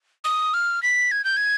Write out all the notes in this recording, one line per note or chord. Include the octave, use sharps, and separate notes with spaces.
D#6
F6
B6
G#6
G6
G#6